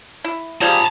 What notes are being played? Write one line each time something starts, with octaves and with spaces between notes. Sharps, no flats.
E4
F3 G3 G#4 A5 A#5